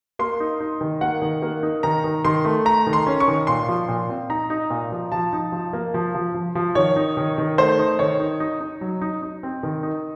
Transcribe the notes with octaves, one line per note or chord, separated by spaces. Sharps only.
A#3 C6
D#4
D#4
D#3
A#3 F#5
D#3
A#3
D#4
D#3 A#5
D#3
D#3 C6
A3
A3 A#5
D#3
C6
C#4
C#6
D#3
A#2 C6
F3
A#2
C4
D#4 A#5
D#4
A#2
F3
F3 A5
D#4
F3
A#3
F3
F3
F3
F3
D#3 C#5
D#4
D#3
D#3
A3 C5
D#4
D#3 C#5
D#4
D#4
D#4
F#3
D#4
D#4
C4
D#3
D#4